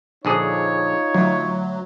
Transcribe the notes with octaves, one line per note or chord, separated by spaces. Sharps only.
A#1 D3 D#4 F4 G#4 C#5
D2 F#3